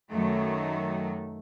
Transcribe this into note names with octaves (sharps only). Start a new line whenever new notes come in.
F#2 D#3 F#3 A3